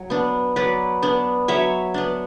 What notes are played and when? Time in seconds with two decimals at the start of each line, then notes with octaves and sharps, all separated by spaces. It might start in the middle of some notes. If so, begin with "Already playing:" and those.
Already playing: F#3
0.10 B3 D4
0.56 F#3 B4 D5
1.02 B3 D4
1.48 F#3 C#5 E5
1.94 B3 D4